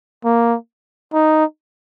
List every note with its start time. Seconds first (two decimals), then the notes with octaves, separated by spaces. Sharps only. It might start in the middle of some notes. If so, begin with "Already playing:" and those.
0.24 A#3
1.13 D#4